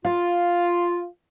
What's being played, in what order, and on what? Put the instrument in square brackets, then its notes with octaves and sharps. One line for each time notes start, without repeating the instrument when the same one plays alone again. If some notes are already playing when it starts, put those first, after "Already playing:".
[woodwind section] F4 [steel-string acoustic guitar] F5